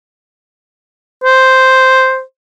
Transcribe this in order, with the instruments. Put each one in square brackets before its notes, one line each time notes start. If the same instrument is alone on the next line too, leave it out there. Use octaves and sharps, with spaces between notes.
[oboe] C5